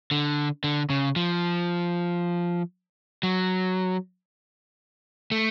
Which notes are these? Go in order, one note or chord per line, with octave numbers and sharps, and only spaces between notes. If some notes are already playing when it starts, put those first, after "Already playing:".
D3
D3
C#3
F3
F#3
A3